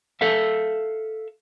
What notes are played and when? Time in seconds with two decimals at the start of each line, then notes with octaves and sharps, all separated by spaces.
0.21 A4 E5 F5